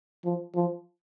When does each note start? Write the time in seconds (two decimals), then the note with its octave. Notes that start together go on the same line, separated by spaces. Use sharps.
0.25 F3
0.55 F3